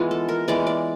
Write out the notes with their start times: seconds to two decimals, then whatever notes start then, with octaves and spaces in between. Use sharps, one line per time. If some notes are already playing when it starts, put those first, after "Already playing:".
Already playing: E3 G#3 B3 F4
0.11 A4
0.29 A#4
0.48 E3 G#3 B3 D5
0.67 D5